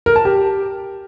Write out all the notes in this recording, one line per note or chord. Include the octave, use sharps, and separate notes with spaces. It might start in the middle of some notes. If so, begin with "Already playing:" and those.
A#4
A5
G4